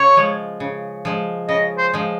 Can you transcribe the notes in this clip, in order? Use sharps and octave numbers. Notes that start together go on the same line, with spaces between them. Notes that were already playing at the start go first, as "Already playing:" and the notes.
Already playing: C#3 C#5
F3 G#3
C#3
F3 G#3
C#3 D#5
C5
F3 G#3